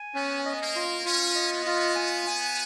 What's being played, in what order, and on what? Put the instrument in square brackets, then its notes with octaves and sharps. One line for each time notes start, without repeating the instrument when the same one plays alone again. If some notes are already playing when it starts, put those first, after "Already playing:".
Already playing: [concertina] G#5
[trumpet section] B3 [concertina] C#4
[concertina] D#5
[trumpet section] A#3
[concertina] F4
[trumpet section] C#4 [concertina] F4
[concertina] D#5
[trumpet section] B3
[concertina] F4
G#5
G#5